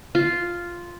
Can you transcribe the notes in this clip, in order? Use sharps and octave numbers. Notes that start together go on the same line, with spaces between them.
F4